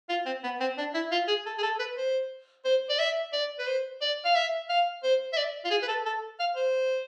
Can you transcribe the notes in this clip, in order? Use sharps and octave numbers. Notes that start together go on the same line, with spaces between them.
F4
C4
B3
C4
D4
E4
F4
G#4
A4
G#4
A4
B4
C5
C5
D5
E5
D5
B4
C5
D5
F5
E5
F5
C5
E5
D5
F4
G#4
B4
A4
A4
F5
C5